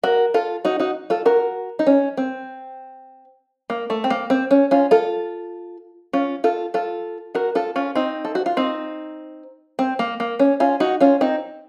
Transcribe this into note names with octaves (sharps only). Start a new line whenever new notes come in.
F#4 A#4
F4 A4
D#4 F#4
D#4 F#4
F4 A4
F#4 A#4
D#4
C#4
C4
A#3
A3
C4
A#3
C4
C#4
C#4 F4
F4 A4
C#4 F4
F4 A4
F4 A4
F#4 A#4
F4 A4
C#4 F4
C4 D#4
A4
F#4
F4
C4 D#4
C4
A#3
A#3
C#4
C#4 F4
D#4 F#4
C#4 F4
C4 D#4